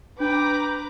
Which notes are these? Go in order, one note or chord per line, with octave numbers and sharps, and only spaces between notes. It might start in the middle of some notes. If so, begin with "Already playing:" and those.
D4 B4 G5 A#5 D6